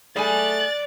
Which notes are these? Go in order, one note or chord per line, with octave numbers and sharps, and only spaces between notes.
A3 G#4 D5 G#5 B5 F#6 A6